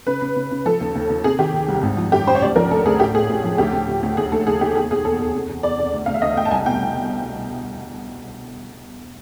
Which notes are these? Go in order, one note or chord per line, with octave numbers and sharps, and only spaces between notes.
C#3 B4
C#3
C#3
C#3
F3 A4
D#2
D#2
D#2
C3 G#4
D#3 G4
D#3
C2
G#1
F3
F#2 G4
F#2 C5
C#5
D2 D5
F3 A#4
D2 A4
D2 G#4
A1 G4
A2 G#4
A2
F3
D2 G4
D2
D2
D2
D#2 G#4
D#2 A4
D#2 G#4
D#2 G4
E2 G#4
B2 G#4
E2 A4
E2 A4
C3
E2
E2 D5
E2
D2
D2 F5
E5
D2 D#5
D2 G5
A5
C2 G#5
B2 G5